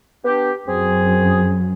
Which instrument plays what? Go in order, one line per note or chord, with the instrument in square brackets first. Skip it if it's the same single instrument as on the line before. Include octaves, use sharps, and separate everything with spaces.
[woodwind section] B3 D4 G4
[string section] F#2 [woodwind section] C4 F#4 G#4